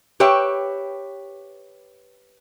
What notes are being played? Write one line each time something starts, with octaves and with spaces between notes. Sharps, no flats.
G4 B4 C#5 E5 G5